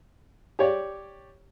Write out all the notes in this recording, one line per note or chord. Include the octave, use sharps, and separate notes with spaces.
G4 C#5 D5